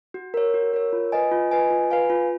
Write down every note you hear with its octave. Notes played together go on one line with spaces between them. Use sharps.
F#4
A#4 C#5
F#4
A#4 C#5
F4
B4 D#5 G#5
F4
B4 D#5 G#5
F4
B4 F5 G#5
F4